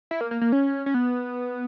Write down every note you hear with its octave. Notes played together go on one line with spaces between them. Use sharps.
E4
A#3
A#3
A#3
C#4
C#4
B3